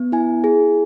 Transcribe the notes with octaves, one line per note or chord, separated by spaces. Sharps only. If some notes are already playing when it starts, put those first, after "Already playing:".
Already playing: B3
E4 G#5
G#4